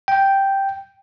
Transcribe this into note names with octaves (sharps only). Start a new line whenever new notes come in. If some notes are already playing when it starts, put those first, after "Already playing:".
G5